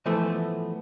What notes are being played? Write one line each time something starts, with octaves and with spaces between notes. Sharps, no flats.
E3 F3 A3 B3 C5